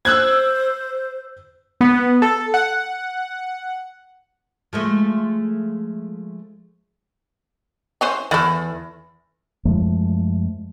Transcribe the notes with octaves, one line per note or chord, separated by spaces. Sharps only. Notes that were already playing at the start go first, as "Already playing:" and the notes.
C5 E6 F#6 G#6
B3
A4
F#5
F3 G#3 A3
E3 C#4 C5
E2 A3 E4
F#2 F3 G#3 A3